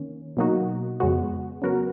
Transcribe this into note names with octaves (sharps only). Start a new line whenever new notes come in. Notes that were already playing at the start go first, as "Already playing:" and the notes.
Already playing: D#3 A#3 C#4
B2 F#3 A#3 D#4 F#4
F2 C#3 G#3 B3 F#4
C#3 F#3 B3 F#4 A#4